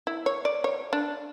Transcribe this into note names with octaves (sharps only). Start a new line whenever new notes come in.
E4
C#5
D5
C#5
D4